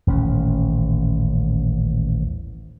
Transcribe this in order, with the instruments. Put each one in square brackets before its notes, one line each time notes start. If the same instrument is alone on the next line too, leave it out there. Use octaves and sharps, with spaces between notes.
[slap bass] D#1 A1 C#4